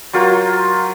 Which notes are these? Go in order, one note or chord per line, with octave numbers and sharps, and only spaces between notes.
F#3 F4 A#4 C5